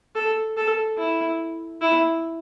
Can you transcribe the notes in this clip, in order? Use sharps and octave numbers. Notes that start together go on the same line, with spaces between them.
A4
A4
E4
E4